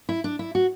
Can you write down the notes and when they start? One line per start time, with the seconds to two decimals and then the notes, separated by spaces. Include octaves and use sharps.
0.09 E4
0.24 D4
0.39 E4
0.55 F#4